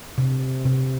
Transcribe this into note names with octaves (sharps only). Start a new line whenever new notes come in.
C3
C3